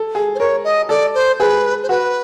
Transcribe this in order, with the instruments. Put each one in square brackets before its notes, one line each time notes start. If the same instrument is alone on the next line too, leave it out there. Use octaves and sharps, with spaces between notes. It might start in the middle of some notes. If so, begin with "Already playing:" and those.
Already playing: [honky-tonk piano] A4
G#4
[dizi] C5
[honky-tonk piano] A#4 [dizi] C#5
[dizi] D#5
[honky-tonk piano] A4 [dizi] D5
[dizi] C5
[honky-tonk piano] G#4 [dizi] B4
[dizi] C5
[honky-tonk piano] F#4 [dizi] B4